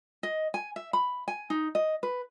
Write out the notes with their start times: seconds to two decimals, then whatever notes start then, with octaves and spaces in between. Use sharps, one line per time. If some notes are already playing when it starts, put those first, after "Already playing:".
0.23 D#5
0.54 G#5
0.76 E5
0.93 B5
1.28 G#5
1.50 D#4
1.75 D#5
2.03 B4